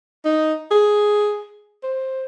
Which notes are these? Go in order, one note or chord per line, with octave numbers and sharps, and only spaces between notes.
D#4
G#4
C5